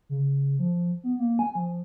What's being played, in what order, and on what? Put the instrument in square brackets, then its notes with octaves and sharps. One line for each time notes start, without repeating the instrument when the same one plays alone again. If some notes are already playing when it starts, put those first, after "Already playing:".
[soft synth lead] C#3
F3
B3
A#3
G#5
F3